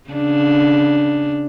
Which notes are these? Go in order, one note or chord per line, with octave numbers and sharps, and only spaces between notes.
C#3 D4